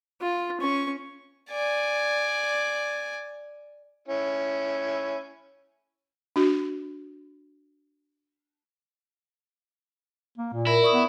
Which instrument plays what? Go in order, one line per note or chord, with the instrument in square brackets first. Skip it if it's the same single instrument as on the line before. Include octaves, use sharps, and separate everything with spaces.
[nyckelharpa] F4
C#4 C#6
[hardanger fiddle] D5 G#5
[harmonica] C#4 E4
[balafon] D4 F#4
[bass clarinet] A#3
A#2
[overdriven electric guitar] E4 [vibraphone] A#4
[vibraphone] D5 C#6 D#6
[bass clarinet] B3